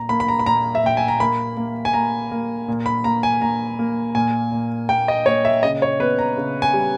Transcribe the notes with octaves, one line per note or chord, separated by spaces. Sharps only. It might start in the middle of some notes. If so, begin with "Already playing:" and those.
Already playing: A#2 A#5
A#3 B5
B5
A#5
B5
A#2 A#5
E5
A#2 G5
G#5
A#5
A#3 B5
A#3
G#5
A#3 A#5
A#3
A#2
B5
A#3 A#5
G#5
A#2 A#5
A#3
A#2 G#5
A#2
A#3 G5
D#5
A#2 C#5
E5
C#3 D#5
C#5
B3 B4
A#5
C#3
G#5
G3